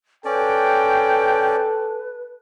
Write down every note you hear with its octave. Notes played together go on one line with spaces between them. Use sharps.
C#4 A4 B4 D5 G5